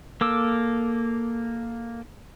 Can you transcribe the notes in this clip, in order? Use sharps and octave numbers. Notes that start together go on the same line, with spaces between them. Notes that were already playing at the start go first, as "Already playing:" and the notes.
A#3 A4 D6 E6